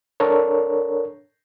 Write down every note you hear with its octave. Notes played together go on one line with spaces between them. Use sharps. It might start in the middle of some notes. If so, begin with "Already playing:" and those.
D4 A4 A#4 C#5